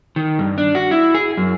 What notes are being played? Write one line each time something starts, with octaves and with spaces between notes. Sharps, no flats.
D#3
G2
D4
F#4
E4
G#4
F#2